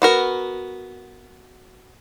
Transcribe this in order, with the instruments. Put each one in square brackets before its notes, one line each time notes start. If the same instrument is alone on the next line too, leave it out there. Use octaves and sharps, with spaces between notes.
[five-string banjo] B3 F#4 A#4